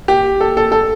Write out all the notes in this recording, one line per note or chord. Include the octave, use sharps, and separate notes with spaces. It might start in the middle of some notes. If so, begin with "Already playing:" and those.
G4
A4
A4
A4